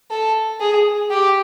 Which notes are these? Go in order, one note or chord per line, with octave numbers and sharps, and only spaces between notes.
A4
G#4
G4